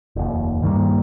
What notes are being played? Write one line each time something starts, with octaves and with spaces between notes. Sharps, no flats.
F1 D#2
G2 D#3 G3 A#3